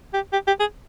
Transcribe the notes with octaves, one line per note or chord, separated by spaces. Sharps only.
G4
G4
G4
G#4